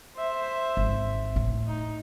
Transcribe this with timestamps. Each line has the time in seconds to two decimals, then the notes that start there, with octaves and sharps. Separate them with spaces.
0.17 C5 E5
0.77 G#1
1.36 A2
1.66 D#4